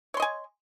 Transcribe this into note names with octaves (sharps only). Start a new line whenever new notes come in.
C#5 D#5 G#5 C6